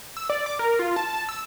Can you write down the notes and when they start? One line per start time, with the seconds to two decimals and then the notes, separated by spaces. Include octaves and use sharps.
0.17 E6
0.30 D5
0.46 D6
0.59 A#4
0.79 F4
0.96 A5
1.10 A5
1.29 E6